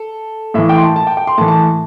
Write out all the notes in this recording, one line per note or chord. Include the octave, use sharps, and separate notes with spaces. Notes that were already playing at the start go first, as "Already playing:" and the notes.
Already playing: A4
A2 E3 E5
G5
C6
A5
A5
G5
G5
C6
A2 E3 A5
A5